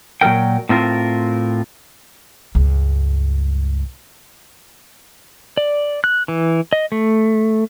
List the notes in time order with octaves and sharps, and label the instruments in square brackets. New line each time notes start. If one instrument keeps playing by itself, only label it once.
[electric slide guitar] A#2 F#3 D4 A#4 G5
A2 C4 F4 A#4
[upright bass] C#2 G2
[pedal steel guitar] D5
F#6
E3
D#5
A3